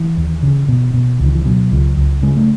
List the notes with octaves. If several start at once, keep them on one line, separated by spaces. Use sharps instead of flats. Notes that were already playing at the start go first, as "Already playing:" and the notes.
Already playing: E3
D#2
C#3
B2
B2
C#2
D#3
E3
B2 F#3
C#2
C#2
C#3 G#3
A3